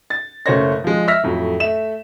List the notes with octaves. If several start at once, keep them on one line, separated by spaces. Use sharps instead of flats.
A6
F#1 C#3 A3 C5 C#5 A#6
F3 G#3
E5 E6 F6 A#6 B6
F2 A2 F#3
A3 E5 E7